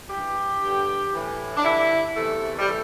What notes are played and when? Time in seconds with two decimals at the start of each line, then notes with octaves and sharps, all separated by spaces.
0.10 G2 E3 G4
0.61 G2 D3
1.12 A2 E3
1.56 D4
1.64 G2 D3 E4
2.16 E2 C3 E3 A3
2.59 G3
2.67 E3 A3